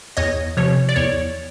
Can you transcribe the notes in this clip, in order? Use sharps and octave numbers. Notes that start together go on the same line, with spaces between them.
E2 C#5 D#5
C3 F3 C#5
D5
E2 C#5